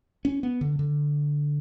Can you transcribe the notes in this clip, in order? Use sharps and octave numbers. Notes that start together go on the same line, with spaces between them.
C#4
B3
D3
D3